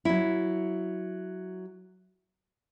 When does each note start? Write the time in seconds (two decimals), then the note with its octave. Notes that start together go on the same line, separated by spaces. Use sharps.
0.05 F#3 E4